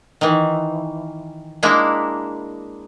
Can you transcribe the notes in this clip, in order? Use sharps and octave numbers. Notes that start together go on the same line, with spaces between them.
D#3 E3
G#3 A#3 D4 E4